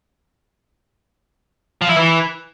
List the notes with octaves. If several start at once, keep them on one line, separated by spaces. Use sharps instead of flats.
F3
E4
E3